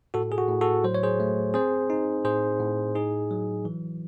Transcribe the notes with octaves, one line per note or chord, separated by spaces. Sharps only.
A2 F#4 A4
G#4
F#4
A2
F#4 A4
F#3 C5
C#5
G#4 C5
A3
C4 G#4 C5
D#4
A2 G#4 C5
A2
D#4 G#4
F#3
E3